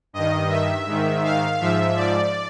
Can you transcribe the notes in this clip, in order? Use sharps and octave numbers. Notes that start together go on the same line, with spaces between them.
G2 D#3 D#5
E5
G#2 D#3
F5
G#2 F3 E5
D5